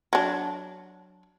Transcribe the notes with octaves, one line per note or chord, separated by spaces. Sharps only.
F#3 D4